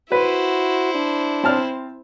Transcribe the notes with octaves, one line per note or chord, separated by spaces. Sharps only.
E4 F#4 B4 C5
D4
C4 A5 F6